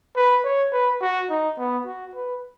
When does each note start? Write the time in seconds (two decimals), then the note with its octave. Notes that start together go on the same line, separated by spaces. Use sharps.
0.16 B4
0.44 C#5
0.72 B4
1.01 F#4
1.30 D#4
1.58 B3
1.86 F#4
2.15 B4